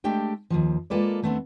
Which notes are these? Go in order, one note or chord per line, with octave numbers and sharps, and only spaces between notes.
G#3 A3 D4 G4 G5
D#2 A#2 F3
G#3 A#3 F4 A4 B4 D5
D#2 A3 B3 C4 D4